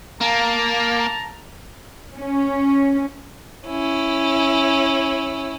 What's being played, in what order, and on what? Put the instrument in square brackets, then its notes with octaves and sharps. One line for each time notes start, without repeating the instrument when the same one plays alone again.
[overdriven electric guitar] A#3 [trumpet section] A5 A#5
[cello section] C#4
[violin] C#4 E4